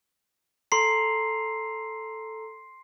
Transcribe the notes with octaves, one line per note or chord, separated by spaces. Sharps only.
A4 A#5 C6 C7